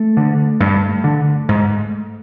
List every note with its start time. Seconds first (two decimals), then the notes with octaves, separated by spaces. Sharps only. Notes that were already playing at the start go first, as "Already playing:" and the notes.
Already playing: A3
0.17 D3
0.60 G2
1.04 D3
1.49 G#2